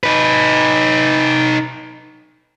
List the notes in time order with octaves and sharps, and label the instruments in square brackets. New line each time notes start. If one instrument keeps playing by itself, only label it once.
[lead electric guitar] D#4 B4